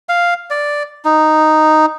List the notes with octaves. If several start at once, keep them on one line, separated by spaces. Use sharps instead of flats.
F5
D5
D#4